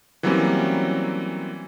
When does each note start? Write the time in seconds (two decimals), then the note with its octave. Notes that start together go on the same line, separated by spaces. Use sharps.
0.23 E3 F#3 G3 A#3 C4 C#4